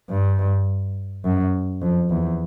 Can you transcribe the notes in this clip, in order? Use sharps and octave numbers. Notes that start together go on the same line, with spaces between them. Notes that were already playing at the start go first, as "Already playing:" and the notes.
G2
F#2
F2
E2